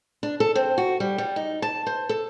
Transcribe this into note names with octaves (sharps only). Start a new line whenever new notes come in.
D4
A4
C4
F#4
G3
G3
D#4
A5
C5
A4